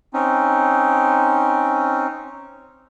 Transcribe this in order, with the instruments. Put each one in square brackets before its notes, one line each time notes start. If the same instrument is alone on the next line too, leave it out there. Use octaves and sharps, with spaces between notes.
[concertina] C4 C#4 D#4